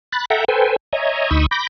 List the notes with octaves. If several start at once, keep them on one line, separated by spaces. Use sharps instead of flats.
B5 F#6 A6
A4 E5 F#5 G5 A#5
A4 B4 C5 G5 G#5
C#5 D#5 E5 G#5 A#5
D2 D#4 B5 C#6 D#6 E6
B5 D6 G6 A#6